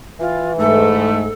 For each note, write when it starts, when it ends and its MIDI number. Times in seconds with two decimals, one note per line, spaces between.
0.20 1.21 52
0.20 0.53 65
0.58 1.29 44
0.58 1.29 57
0.58 1.33 69